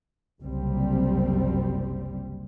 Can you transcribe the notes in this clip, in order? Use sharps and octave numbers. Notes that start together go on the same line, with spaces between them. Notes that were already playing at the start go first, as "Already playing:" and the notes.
F#1 C2 G3 C4